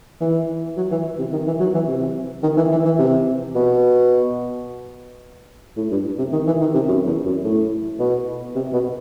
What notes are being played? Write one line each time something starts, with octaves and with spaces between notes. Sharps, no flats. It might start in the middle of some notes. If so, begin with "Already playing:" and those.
E3
F#3
E3
C3
D#3
E3
F#3
E3
C3
D#3
E3
E3
E3
C3
B2
A2
G2
C3
D#3
E3
D#3
C3
F#2
E2
F#2
A2
B2
C3
B2